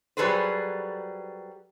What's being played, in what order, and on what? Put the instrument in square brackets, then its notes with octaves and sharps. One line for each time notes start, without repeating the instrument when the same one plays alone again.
[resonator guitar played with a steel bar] F#3 G3 G#4 A4 B4 C5